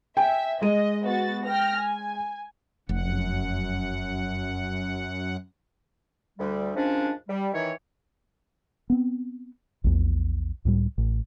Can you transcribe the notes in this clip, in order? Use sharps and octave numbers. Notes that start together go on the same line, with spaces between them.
E5 G5 G#5
G#3 D#5 D#7
B3 F#4 A6
G5 F6 A#6
G#5
F1 F#2 F#5
D2 G3
D#2 G#2 F3 C#4 D4
G3
D#3 E3 C#5
B3 C4
A#1 E2
C#2 A2 G3
A1